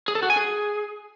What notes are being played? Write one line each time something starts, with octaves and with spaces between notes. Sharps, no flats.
G#4
A4
F#4
G#5
G#4